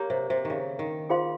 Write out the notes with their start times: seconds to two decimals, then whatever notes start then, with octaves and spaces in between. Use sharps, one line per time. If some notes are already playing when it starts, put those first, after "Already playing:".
Already playing: A#3 G4 C#5 F5 A#5
0.10 C3
0.30 C3
0.45 D#3
0.50 C#3
0.79 D#3
1.09 F4 G#4 C5 F5 C6